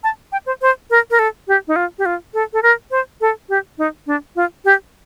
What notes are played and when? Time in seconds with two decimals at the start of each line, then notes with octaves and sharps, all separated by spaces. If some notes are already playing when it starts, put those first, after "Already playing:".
0.04 A5
0.32 G5
0.46 C5
0.62 C5
0.90 A#4
1.11 A#4
1.19 A4
1.48 G4
1.68 D#4
1.76 F4
1.98 G4
2.06 F4
2.34 A4
2.53 A4
2.63 A#4
2.91 C5
3.21 A4
3.49 G4
3.78 D#4
4.07 D4
4.36 F4
4.65 G4